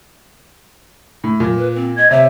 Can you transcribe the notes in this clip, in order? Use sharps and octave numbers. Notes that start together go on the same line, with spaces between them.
A2
A#2 F#3
B4
C4
D#5 G#6
C3 C#5 E5